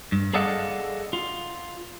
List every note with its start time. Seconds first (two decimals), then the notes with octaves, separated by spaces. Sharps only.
0.12 G2
0.33 G#4 A4 D5 D#5 F5 F#5
1.13 F4